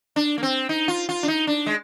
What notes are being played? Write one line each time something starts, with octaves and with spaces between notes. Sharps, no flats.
D4
A#3
C4
D#4
F4
F4
D4
D#4
D4
G#3